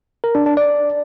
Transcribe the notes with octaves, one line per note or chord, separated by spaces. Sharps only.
A#4
D4
D4
D5